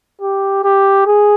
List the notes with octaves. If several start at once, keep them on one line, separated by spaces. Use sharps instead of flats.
G4
G4
G#4